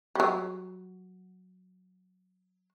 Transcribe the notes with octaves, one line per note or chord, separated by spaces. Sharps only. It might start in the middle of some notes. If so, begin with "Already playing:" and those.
F#3 G3